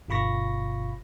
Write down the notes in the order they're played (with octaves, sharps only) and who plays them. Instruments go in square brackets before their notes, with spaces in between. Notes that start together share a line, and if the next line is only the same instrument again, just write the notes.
[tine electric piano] G1 B2 F4 B5 C#6 A#6